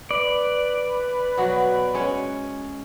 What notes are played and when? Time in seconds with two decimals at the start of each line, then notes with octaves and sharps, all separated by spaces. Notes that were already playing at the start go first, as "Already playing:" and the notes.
0.11 B4 D5
1.37 B2 F#3 F#4
1.94 G#3 C#4 C#5